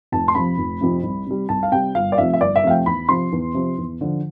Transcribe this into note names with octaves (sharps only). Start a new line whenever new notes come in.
F1 A5
C6
F2 C3 F3 B5
F1
F2 C3 F3
C2
C3 G3
C2 A5
F5
C3 G3 G5
G1 F5
D5
F2 C3 F3 A3 E5
E5
G1 D5
E5
F2 C3 F3 A3 F5
G5
E2 B5
C3 F3 C6
E2
C3 F3
E2
D3 F3